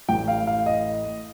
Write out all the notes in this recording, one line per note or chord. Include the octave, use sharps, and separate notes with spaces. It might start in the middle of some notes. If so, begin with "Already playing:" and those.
A1 A2 G5
F5
F5
D#5